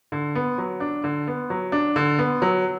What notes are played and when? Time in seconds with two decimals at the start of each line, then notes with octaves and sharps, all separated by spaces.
0.12 D3
0.35 B3
0.58 F#3
0.80 D4
1.04 D3
1.27 B3
1.50 F#3
1.72 D4
1.96 D3
2.19 B3
2.42 F#3